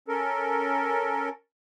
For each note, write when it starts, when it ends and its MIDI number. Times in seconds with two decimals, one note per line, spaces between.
0.08 1.29 61
0.08 1.29 69
0.08 1.29 70